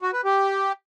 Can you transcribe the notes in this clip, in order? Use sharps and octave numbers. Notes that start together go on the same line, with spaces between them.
F#4
B4
G4